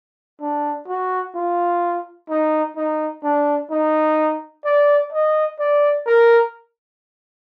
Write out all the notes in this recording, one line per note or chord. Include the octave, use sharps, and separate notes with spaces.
D4
F#4
F4
D#4
D#4
D4
D#4
D5
D#5
D5
A#4